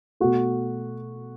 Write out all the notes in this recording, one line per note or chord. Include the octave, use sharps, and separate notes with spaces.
B2 A3 F#4